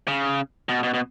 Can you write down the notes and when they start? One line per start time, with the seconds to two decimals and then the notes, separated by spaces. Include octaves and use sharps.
0.08 C#3
0.69 B2
0.83 B2
0.94 B2